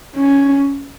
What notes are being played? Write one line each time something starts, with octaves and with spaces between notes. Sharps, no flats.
C#4